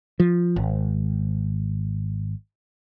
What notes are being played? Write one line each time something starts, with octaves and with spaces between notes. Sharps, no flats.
F3
G#1